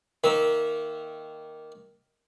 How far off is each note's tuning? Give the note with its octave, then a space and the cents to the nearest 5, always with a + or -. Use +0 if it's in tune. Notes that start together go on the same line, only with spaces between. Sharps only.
D#3 +0 A#3 +0 E5 -20